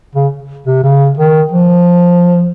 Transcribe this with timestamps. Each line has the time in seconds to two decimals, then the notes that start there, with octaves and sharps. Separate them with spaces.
0.15 C#3
0.66 C3
0.83 C#3
1.17 D#3
1.52 F3